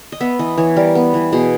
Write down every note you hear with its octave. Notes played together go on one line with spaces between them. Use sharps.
D#5
B3 E5
E3 D#5
E3 C#5
G3 A#4
B3
E3
B2 G#4